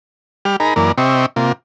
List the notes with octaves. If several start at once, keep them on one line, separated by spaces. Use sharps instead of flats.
G3 G4 F6
D#4 G#4 A#4 A#5 B5
F#2 E3 A#3 A#4 D5
C3 C4 G4 D#5 E5 C#6
C3 A#3 F4